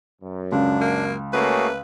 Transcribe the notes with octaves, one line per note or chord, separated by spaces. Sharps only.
F#2
C#2 D4
A#3
C#3 A3 A#3 C#4 F#4 G#4 B4